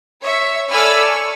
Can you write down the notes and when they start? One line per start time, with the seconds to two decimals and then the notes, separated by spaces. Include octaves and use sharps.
0.23 C#5 E5
0.72 A4 D5 G#5 B5 E6 F6
1.05 C#6